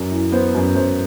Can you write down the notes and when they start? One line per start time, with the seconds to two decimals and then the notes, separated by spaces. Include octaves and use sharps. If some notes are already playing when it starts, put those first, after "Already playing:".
Already playing: F#2
0.11 E3
0.32 B3 C5
0.55 F#2
0.75 F#2 C5